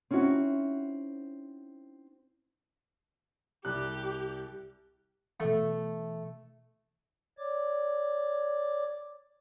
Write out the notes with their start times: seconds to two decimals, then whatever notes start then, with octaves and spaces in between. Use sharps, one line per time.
0.11 C4 C#4 D#4 E4 F#4
3.65 C2 G3 G4 F#6
5.40 B2 E3 A3
7.38 C#5 D5 D6